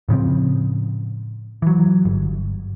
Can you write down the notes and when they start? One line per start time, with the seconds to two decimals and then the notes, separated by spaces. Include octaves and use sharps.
0.09 A2 C#3 F3 C4
1.62 E3 F#3
2.05 G1